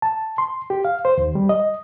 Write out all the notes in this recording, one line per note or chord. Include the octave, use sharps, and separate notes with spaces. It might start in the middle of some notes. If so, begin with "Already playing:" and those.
A5
C6
G4
F5
C5
D#2
G3
D#5